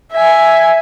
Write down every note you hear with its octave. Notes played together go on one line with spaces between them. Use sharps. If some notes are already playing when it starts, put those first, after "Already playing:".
E5 G#5